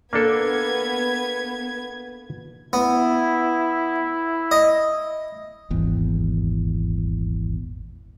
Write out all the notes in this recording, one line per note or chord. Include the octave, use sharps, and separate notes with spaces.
A#3 B3 D4 A4 G#6
B3 E4
D#5
D#1 G#1 E2